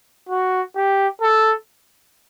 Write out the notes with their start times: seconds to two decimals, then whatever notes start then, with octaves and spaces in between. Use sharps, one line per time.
0.29 F#4
0.75 G4
1.22 A4